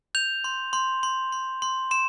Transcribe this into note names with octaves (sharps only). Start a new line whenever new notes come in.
G6 F7
C6
C6
C6
C6
C6
C6 E7